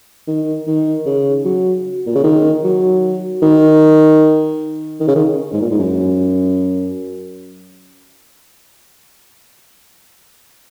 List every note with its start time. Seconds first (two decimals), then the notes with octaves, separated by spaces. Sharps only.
0.27 D#3
0.67 D#3
1.06 C#3
1.45 F#3
2.06 A#2
2.15 C#3
2.24 D#3
2.64 F#3
3.43 D#3
5.00 D#3
5.08 C#3
5.16 D#3
5.53 G#2
5.61 A#2
5.70 G#2
5.79 F#2